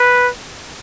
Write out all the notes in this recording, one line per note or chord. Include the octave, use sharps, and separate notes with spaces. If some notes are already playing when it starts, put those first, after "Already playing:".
Already playing: B4